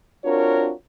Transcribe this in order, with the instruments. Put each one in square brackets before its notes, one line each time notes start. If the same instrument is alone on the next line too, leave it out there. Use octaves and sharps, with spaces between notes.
[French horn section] C4 D4 F4 F#4 A#4 C#5